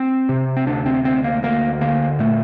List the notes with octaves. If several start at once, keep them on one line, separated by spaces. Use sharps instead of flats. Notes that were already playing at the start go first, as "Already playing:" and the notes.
Already playing: C4
C3
C4
D2 D4
C4
D2 C4
A#3
D2 A#3
D3 A#3
A#2 A3